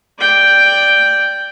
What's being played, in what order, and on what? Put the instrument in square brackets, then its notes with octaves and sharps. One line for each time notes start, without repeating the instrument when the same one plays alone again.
[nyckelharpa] D5 G5